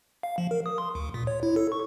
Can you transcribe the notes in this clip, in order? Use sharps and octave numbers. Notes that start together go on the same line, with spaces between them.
F5
F3
A#4
D#6
C6
D2
A#2
C#5
E4
A4
C#6